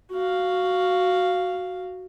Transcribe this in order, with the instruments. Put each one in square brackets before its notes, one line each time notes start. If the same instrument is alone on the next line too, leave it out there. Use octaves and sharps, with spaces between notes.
[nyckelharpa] F#4 F5